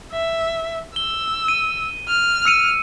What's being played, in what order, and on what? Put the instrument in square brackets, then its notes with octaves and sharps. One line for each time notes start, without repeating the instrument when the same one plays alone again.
[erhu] E5
[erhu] E6 [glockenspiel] G7
[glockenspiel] D#7
[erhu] F6
[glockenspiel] E6 C#7 D#7